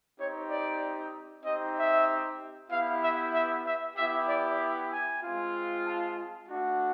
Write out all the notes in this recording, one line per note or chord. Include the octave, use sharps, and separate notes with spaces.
C4 D#4 G4 C#5
D5
C4 D#4 G4 D#5
E5
B3 E4 G4 F5
E5
E5
E5
B3 E4 G4 E5
D5
G#5
G#3 C4 F4
A5
A3 D4 F#4